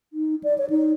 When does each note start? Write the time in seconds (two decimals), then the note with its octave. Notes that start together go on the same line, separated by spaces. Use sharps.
0.13 D#4
0.44 D5
0.58 C#5
0.70 D#4